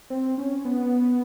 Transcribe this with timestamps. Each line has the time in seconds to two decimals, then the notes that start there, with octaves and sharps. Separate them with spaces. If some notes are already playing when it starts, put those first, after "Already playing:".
0.10 C4
0.38 C#4
0.65 B3